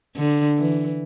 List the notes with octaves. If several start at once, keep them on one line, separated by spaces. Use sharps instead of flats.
D3
E3